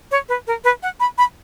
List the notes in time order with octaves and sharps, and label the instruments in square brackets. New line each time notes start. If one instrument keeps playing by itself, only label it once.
[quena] C#5
B4
A#4
B4
F#5
B5
B5